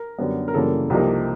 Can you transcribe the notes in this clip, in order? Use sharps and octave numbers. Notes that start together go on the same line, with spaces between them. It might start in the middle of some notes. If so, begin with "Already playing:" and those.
Already playing: A#4
F#2 D3 G3 B3
A#4
F#2 C#3 E3 G3 A#3 A4
C2 C3 F3 A#3 D#4